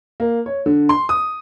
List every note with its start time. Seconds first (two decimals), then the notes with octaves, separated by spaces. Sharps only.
0.20 A#3
0.46 C#5
0.66 D3
0.89 C6
1.09 D#6